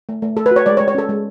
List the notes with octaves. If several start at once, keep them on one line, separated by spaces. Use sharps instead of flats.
A3
A3
A3 A4
B4
F#4 C#5
G#3 D5
C#5
G#3
C#5
C#4 A4
G#3